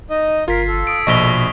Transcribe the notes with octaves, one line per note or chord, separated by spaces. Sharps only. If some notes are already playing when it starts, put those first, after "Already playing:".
D#4 D#5
G1 F4 A#4 G#6 B6 C7
A4
D#6 D7
A#1 B2 D#5 C#6 F7 G7